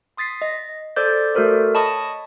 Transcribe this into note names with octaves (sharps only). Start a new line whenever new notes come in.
C6 D#6 A6 B6 C7
D#5
A4 C5 D5 D6 G6
A3 F#4 A4 A#4 C5 D5
C#5 D#5 A5 B5 C#6 D#6